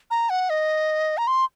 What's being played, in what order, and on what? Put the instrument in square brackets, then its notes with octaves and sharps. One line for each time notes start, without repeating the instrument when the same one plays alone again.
[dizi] A#5
F#5
D#5
A#5
C6